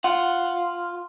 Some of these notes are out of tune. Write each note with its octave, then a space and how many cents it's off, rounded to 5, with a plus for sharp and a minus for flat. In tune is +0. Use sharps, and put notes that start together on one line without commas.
F4 +0 F#5 +0